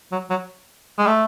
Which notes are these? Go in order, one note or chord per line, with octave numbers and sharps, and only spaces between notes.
F#3
F#3
G#3
A3